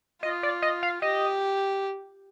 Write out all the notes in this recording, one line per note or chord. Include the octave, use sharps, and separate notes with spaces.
F4 D#5
D5
D#5
F5
G4 D#5